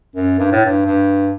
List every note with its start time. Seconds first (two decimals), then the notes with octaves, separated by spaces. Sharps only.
0.15 F#2
0.39 G2
0.52 A2
0.65 G2
0.86 G2